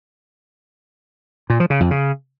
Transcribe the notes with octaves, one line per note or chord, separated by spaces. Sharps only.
A#2
F3
C#3
F2
C#3